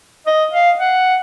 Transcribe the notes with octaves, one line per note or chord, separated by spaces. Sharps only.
D#5
F5
F#5